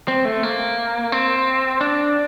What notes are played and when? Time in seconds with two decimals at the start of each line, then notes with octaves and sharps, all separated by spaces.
0.08 C4
0.25 A3
0.43 A#3
1.12 C4
1.81 D4